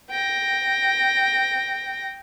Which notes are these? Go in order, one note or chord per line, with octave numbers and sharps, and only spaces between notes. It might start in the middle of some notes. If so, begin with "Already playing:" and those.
G5 A#6